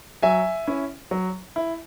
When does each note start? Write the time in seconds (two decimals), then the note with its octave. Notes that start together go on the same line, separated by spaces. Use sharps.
0.23 F#3 E5 G#5
0.67 C#4 E4
1.11 F#3
1.56 E4